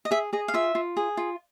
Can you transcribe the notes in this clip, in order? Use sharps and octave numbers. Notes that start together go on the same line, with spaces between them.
D#5
G#4 E5
G#4 D#5
F5
F4 E5
F4
G#4
F4